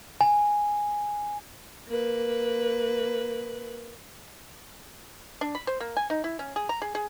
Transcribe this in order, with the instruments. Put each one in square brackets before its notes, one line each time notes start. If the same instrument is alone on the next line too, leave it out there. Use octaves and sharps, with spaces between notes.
[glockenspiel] G#5
[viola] A#3 B4
[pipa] D4
B5
C5
A#3
G#5
D#4
E4
C#4
G#4
A#5
G#4
G#4